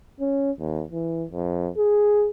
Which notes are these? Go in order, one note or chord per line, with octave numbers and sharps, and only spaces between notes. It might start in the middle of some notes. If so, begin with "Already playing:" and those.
C#4
D#2
E3
F2
G#4